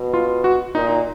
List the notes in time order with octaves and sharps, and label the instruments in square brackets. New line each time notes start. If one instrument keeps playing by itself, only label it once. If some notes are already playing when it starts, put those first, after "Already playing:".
Already playing: [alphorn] B2
[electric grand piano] F4
F#4
[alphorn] A#2 [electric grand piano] D#4